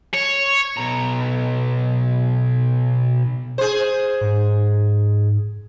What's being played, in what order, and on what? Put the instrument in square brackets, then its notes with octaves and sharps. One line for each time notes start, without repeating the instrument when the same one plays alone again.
[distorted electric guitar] C#5
B1 A#5
[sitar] G#4 C5
[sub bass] G#2